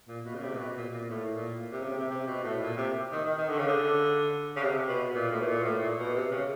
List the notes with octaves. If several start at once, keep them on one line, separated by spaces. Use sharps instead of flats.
A#2
B2
C#3
C3
A#2
B2
A#2
A#2
A2
A#2
C3
C#3
C3
C3
C3
B2
A2
A#2
C3
D#3
D#3
D#3
D3
C#3
D3
C#3
C3
B2
A#2
A2
B2
A#2
A2
A#2
B2
C3
C#3